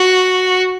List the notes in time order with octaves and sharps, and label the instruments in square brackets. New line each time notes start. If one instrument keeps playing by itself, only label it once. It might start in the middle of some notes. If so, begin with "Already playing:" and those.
Already playing: [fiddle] F#4